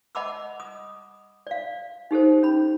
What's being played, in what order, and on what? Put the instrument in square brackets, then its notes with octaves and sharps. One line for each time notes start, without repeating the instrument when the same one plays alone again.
[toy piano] D#5 F#5 A5 B5 D6 E6
D#6
D5 F5
D#4 G4 A4 C5
C#4 B5